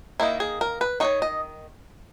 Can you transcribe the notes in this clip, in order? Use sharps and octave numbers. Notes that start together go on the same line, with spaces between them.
D#3 A#3 D#4 E4
G#4
A#4
B4
D#3 A#3 D#4 C#5
D#5